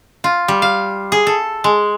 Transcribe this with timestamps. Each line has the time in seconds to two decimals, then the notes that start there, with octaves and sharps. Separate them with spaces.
0.24 F4
0.48 G3
0.62 F5
1.12 G#4
1.27 A4
1.64 G#3